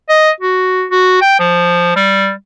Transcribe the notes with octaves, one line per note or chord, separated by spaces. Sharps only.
D#5
F#4
F#4
G5
F3
G3